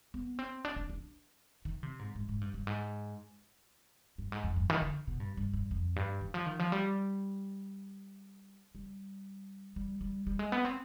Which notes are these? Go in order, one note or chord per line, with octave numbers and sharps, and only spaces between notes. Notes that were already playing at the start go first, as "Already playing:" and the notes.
B3
C4
D4
D4
D4
D#3
C3
G#2
G#2
G#2
G2
G2
G#2
G2
G#2
F2
G2
D#3
D3
B2
G2
G2
G2
F2
G2
D#3
F3
D#3
F3
G3
G3
G3
G3
G3
G#3
B3
C4